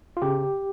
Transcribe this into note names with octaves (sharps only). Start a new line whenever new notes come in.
F4
C#3 G4